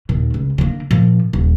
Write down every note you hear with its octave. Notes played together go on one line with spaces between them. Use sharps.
D#2 A#2
C#2
D3 A#3
A#2 F3
D#1